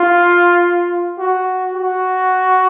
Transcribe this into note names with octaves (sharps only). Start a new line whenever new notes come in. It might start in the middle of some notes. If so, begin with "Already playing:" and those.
Already playing: F4
F#4
F#4